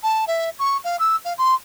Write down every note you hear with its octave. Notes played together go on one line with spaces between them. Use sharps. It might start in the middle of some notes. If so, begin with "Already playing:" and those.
A5
E5
C#6
F5
E6
F5
C6